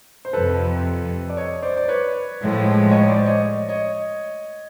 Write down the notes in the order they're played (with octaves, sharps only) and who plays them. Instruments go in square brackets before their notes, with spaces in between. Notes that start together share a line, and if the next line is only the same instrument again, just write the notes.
[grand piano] C5
[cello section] F2 C3 F3 [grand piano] A4 B4
[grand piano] D5
C#5 D#5
C5 D5
D5
B4 C#5
[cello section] A2 F3 G#3
[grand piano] C#5 D#5
C5 D5
C#5 D#5
C#5 D#5